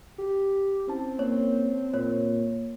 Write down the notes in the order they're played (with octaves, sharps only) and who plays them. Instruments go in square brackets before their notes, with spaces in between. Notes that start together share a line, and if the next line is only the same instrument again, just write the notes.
[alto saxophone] G4
[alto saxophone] C4 [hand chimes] C#4 E4 A5
[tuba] A#3 [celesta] C#5
[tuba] A#2 [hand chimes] A#3 [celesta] C#5